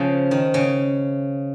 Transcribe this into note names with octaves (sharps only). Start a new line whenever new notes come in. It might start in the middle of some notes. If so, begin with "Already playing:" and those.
Already playing: C#3 F3
D#3
C#3